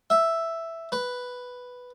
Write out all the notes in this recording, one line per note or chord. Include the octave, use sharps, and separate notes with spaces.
E5
B4